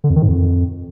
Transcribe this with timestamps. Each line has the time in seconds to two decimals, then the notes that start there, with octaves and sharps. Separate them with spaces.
0.04 D3
0.10 F2
0.16 D#3
0.22 G#2
0.28 F2